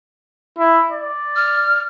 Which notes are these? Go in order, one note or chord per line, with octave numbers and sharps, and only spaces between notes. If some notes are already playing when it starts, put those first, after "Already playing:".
E4
D5
F6